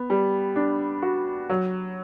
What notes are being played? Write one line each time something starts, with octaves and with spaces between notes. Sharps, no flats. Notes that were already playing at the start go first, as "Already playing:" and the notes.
Already playing: B3
G3
D4
F#4
F#3